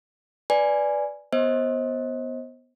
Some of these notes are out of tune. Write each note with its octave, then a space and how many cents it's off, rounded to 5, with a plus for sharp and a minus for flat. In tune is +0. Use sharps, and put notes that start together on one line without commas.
B4 +0 D5 +0 G#5 +0
B3 +0 C5 +25 D#5 +30